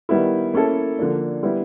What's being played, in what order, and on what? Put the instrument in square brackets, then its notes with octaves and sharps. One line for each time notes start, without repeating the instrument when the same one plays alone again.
[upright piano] D#3 G3 B3 E4
A#3 C#4 E4 A4
D3 F3 A#3 D4
G3 B3 E4